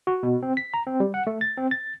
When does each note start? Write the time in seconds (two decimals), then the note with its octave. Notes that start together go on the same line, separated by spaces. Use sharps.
0.07 F#4
0.23 B2
0.43 C4
0.57 B6
0.74 A#5
0.87 C4
1.00 G3
1.14 F#5
1.27 A3
1.41 A6
1.58 C4
1.71 A6